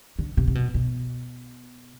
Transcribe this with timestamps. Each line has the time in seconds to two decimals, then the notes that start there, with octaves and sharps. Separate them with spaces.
0.19 D3
0.37 C3
0.48 C3
0.55 B2
0.74 B2